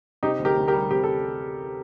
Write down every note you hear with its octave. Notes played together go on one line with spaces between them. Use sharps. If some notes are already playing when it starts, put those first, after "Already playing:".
C3 D#4 G4
D2
G4 A#4
D2
G4 A#4
G3
C3 G4
A4